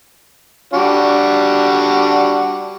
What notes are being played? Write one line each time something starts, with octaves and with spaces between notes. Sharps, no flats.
G3 D4 F#4